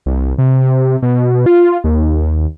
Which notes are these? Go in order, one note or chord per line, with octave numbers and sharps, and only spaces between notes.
C2
C3
B2
F4
D#2